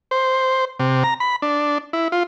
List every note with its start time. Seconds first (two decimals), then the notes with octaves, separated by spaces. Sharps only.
0.11 C5
0.80 C3
1.03 A#5
1.20 B5
1.42 D4
1.93 E4
2.12 F4